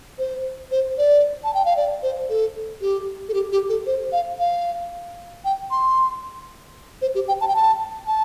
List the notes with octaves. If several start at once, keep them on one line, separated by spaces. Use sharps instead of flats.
C5
C5
D5
A5
G5
F5
D5
C5
A4
G4
A4
G4
G4
A4
C5
F5
F5
G5
C6
C5
G4
G5
A5
G5
A5
A5